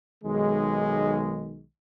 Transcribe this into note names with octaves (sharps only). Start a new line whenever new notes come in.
B1 D#3 G#3